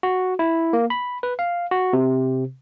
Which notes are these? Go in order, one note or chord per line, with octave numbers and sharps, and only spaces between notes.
F#4
E4
A#3
B5
B4
F5
F#4
C3